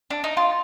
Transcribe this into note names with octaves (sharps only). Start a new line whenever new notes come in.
D4
D#4
F4